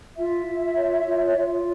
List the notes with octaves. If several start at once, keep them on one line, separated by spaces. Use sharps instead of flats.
F4 E5
F4
C#5
F4
F4